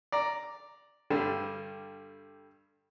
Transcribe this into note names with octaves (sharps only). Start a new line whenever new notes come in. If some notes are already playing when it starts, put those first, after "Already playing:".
D5 A#5
G2 D3 G3